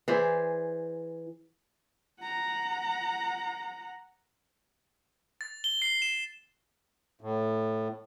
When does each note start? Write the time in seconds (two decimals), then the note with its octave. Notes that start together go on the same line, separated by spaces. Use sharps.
0.08 E3 G#4 C5 D5
2.21 F#5 A#5
5.41 A6
5.64 G7
5.82 C7
6.02 E7
7.21 A2